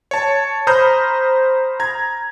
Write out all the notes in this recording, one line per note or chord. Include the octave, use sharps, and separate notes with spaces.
C#5 A5
C5 A#5 B5 D#6 F6 G6
A#5 G#6